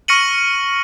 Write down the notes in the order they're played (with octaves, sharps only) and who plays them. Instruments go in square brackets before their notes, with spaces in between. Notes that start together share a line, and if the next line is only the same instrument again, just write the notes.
[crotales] C#6 F6 A#6 C#7 D#7 F#7